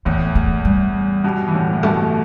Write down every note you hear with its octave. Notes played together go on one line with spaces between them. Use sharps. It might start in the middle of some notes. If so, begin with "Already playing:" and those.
E2 A2 B3
A3
G3
G2 B2
E3
A2 D3
A2
G2 B2 A3